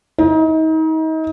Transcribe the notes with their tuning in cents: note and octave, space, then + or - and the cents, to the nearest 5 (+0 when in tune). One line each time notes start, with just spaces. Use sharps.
D#4 +35